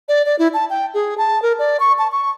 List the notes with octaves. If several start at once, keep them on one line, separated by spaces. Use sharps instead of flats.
D5
D5
E4
A5
G5
G#4
A5
A#4
D5
C#6
A5
C#6